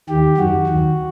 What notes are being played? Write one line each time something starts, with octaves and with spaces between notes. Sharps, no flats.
D#2 D#3 G4
F#2 D#3 F#4
D#2 D#3